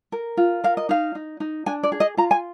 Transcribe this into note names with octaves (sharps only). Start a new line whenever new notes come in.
A#4
F4
A#4 F5
D#5
D#4 F5
D#4
D#4
D4 G#5
D5
G#4
D#5
F4 A#5
G#5